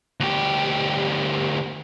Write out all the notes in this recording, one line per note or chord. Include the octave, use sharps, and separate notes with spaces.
D2 G4